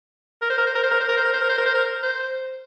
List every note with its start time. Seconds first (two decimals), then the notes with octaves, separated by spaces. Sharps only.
0.42 A#4
0.50 C5
0.58 A#4
0.67 C5
0.75 A#4
0.83 C5
0.91 A#4
1.00 C5
1.09 A#4
1.17 C5
1.25 A#4
1.33 C5
1.41 A#4
1.49 C5
1.58 A#4
1.66 C5
1.75 A#4
2.03 C5